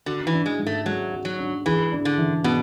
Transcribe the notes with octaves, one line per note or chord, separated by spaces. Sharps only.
D3 F#4
E3
D4
G#3
G#2
A3
F#3 G#3
F#4
F#3
D4
E3 G#4
D4
D3
E3
B2 B3